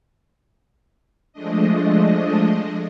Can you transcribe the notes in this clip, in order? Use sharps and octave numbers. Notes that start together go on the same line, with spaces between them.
F3 G#3 A3 D4 D#5